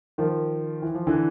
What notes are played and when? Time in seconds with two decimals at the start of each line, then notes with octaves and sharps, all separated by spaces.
0.18 D#3 F3
0.82 E3
0.94 F3
1.07 D3 E3